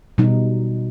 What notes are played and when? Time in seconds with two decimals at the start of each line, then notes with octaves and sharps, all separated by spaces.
0.18 B2 G3 D#4